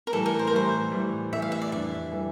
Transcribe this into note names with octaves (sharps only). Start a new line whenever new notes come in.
A#4
A2 E3 G3 A4
A#4
C5
A#4
A2 E3 G3 C5
A2 E3 G3
A2 E3 G3 E5
F5
E5
D5
F2 E3 G3 D4 E5
E3 G3 D4